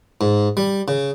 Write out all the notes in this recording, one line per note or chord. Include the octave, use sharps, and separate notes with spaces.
G#2
G3
C#3